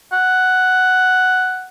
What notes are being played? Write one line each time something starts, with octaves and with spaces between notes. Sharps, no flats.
F#5